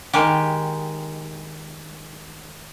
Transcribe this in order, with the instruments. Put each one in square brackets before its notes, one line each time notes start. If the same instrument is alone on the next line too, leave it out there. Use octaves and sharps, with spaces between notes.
[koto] D#3 G#3 G4